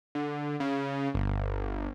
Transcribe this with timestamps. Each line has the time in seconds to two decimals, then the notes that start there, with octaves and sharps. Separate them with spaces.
0.15 D3
0.60 C#3
1.15 G1